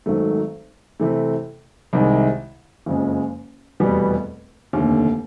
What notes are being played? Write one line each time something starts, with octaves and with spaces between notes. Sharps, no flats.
G#1 G#2 D#3 F#3 A3
C3 E3 A3
C2 C3 D#3 G#3
F#1 F2 C#3 F3 G#3
F1 E2 B2 G3 B3
F1 D#2 D3